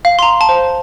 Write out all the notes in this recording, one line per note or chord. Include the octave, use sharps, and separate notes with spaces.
F5
C6
A#5
A5
C5